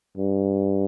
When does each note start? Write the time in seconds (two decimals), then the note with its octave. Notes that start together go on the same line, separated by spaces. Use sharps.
0.17 G2